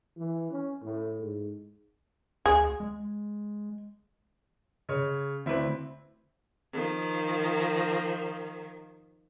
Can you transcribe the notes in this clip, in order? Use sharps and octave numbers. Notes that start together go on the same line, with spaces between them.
E3
C#4
A2
G#2
D2 G#4
G#3
C#3 C#5
D2 C4 E4 B4
D#3 F3